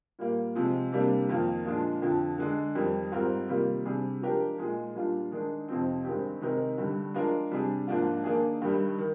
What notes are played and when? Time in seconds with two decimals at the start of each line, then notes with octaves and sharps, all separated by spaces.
0.19 A#2 G3 A#3
0.55 C3 F3 G#3
0.92 C3 G3 A#3 D4
1.29 F2 D#3 A#3 F4
1.65 A#2 F3 G#3 D4
2.02 F2 D3 F3
2.38 D3 G#3 D4
2.75 F2 D#3 G3
3.12 G#2 G3 C4 F4 A#4
3.48 C3 D#3 G3 A#3 F4
3.85 C3 G3 D4 G#4
4.21 F3 G#3 D4 G4 A#4
4.58 A#2 G#3 D#4 G#4
4.95 A#2 G3 D4 F4
5.32 D#3 G#3 D4
5.68 F2 C3 F3 C4 D#4
6.04 G2 D#3 G#3 C4 G4
6.41 C3 D#3 G#3 D#4 A#4
6.78 G2 D3 G3
7.14 F3 G#3 D4 F4 A#4
7.51 C3 G3 D4 G#4
7.87 G#2 F3 A#3 D4 F4
8.24 D#3 A#3 D4 G#4
8.62 G2 D#3 G3
8.98 D#3